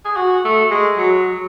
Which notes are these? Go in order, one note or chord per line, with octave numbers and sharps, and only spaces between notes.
G#4
F#4
A3
G#3
F#3